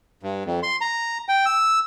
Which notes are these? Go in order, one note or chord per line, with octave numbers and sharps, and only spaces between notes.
G2
F2
C6
A#5
G5
E6